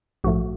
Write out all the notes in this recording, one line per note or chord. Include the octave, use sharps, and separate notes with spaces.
A#1 G#2 F3 A3 F#4